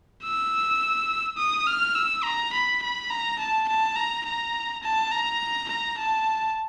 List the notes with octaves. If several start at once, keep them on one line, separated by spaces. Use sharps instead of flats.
E6
D#6
F6
E6
A#5
B5
B5
A#5
A5
A5
A#5
A#5
A5
A#5
A#5
A5